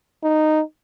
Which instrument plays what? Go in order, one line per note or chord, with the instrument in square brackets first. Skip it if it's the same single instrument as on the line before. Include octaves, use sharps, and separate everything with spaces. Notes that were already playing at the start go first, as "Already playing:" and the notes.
[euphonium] D#4